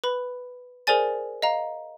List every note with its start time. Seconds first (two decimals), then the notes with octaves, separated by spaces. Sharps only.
0.04 B4 B5
0.87 G#4 A#4 C5 D5 G#5 A6
1.42 D#5 F5 A#5